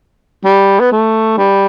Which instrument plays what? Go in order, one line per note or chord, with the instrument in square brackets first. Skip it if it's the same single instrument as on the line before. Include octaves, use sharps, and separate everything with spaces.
[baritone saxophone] G3
B3
A3
G3